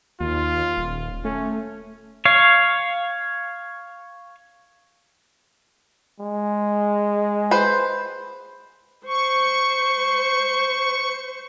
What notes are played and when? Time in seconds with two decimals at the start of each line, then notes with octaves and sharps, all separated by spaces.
0.21 D#2 F4
0.77 D#1
1.25 A3 C#4
2.25 C#5 F5
6.20 G#3
7.51 B4 C5
9.07 C5 C#6